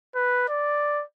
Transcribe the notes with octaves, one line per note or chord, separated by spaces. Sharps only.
B4
D5